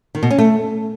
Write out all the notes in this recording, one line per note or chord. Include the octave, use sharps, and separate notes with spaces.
D#3
B2
C#4
A3